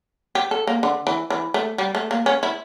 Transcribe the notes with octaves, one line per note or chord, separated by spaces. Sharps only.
G4
A4
A#3
D3
E3
E3
A3
G3
A3
A#3
C#4
E4